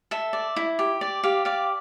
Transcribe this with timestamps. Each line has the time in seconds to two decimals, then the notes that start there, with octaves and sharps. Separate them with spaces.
0.11 A4 E5
0.33 D5
0.56 E4
0.79 G4
1.01 D5
1.23 G4 F5
1.45 D5 F5